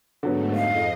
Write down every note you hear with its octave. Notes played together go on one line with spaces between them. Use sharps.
G#2 D3 F#3 A3 B3
F2 D#5 F5